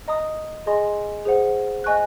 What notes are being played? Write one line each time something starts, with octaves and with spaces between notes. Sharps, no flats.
D#5 A#5 D#6
G#4 D#5 G#5 C6
G#4 C5 F#5
D#5 G#5 C#6 F#6